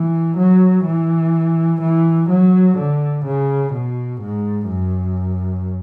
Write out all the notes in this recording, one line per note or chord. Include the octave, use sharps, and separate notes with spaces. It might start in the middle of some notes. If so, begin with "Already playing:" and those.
Already playing: E3
F#3
E3
E3
F#3
D3
C#3
B2
G#2
F#2